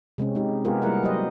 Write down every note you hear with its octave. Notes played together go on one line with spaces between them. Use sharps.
C3 G#3 C4 C#4
G#3 D#4 G4
G#3 B3 F4 G4 G#4 A#4
G3 A#3 E4 A#4 F#5
F#3 G4 C5 D#5